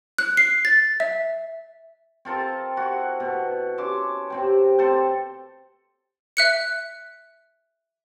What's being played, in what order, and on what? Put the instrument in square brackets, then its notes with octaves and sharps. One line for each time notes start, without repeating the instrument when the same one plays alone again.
[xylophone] F#6
C7
A6
E5
[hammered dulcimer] C4 F4 A4 A#4
E4 F#4
B2
C#4 E5 C6 D6
C3 C4 G5
C4 A4 C5 G5
[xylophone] E5 F#6 C#7